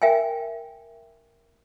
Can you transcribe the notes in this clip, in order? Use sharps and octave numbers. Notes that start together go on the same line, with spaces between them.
A#4 E5 G5 G#5